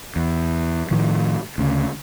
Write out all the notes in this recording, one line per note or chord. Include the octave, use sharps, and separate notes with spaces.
E2
A2 D#3 F3
D2 C#3